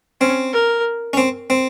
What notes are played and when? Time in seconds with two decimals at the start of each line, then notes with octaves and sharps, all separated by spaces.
0.21 C4 C#4
0.53 A#4
1.13 C#4
1.17 C4
1.50 C4